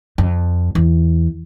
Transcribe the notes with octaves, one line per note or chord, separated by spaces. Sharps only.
F2
E2